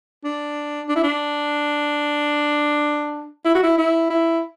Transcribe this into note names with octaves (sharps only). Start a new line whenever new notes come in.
D4
D4
E4
D4
E4
F#4
E4
E4
E4